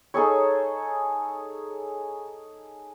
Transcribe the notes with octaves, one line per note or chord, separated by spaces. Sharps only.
D#4 G#4 A4 C#5